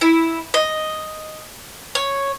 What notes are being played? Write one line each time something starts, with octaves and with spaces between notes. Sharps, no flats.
E4
D#5
C#5